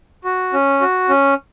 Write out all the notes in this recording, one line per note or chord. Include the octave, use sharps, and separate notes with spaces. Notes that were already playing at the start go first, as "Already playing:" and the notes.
F#4
C#4
F#4
C#4